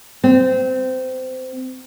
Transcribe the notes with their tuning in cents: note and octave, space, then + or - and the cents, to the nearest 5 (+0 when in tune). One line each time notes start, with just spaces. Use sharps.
C4 -20